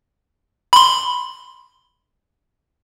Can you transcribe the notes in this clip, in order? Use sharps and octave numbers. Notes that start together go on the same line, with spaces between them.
B5 C6